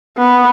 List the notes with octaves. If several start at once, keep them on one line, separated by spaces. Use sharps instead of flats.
B3